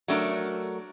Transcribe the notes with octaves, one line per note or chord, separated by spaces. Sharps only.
F#3 A3 D4 F#4 A#4